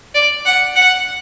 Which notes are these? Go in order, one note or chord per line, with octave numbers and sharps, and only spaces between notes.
D5
F#5
F#5